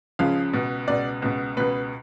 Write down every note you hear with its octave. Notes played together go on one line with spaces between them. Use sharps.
C#2 C#3 F3 F5
C#2 B2
C#2 B2 D5
C#2 B2
C#2 B2 B4